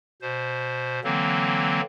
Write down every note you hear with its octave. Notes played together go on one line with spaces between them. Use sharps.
B2 C5
D3 E3 F#3 A#3 C4